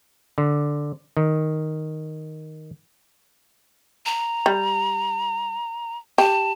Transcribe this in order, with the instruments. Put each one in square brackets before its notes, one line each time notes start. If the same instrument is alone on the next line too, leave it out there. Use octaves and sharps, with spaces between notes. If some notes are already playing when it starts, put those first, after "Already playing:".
[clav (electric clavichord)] D3
D#3
[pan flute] A#5
[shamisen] G3
[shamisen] G4 [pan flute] A5